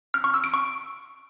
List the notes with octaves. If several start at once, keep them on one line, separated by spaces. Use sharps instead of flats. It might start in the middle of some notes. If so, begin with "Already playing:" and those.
F6
C#6
E6
D7
C#6